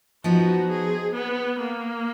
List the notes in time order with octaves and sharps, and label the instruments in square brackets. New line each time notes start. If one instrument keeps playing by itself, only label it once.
[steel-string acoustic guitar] F3 B3 D#4 [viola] F#4
[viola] G#4
B3
A#3